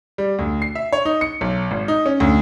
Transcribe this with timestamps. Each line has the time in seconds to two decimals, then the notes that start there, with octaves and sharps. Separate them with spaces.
0.18 G3
0.39 D2
0.62 C7
0.75 E5
0.92 C#5
1.05 D#4
1.21 C#7
1.41 B1
1.71 G#1
1.88 D#4
2.06 C#4
2.20 D2